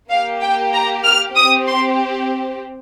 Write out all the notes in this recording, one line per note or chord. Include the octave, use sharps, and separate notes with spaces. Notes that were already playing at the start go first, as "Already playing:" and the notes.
A#3 G4 F5
G5
A#5
F6
C4 G4 D#6
C6